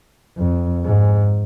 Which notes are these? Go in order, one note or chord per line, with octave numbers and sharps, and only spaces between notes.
F2
G#2